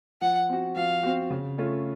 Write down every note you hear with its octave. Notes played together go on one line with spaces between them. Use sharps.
F3 F#5
C4 F#4
F3 F5
C4 F#4
C#3
A3 C#4 F4